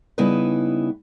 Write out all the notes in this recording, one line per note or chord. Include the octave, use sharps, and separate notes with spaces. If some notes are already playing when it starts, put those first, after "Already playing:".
C#3 G3 B3 D#4 E4 B4